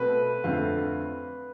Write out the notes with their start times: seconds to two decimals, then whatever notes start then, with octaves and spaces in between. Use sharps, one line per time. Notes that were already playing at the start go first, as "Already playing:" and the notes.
Already playing: B2 A3 C4 B4
0.44 F2 D3 A3 C4 F4